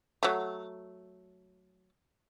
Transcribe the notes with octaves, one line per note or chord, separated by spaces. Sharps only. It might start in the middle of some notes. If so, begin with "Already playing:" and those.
F#3 A3